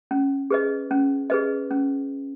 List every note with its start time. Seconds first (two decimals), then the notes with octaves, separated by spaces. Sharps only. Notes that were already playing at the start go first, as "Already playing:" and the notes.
0.11 C#4
0.50 G#4 B4 D#5
0.91 C#4
1.30 G#4 B4 D#5
1.71 C#4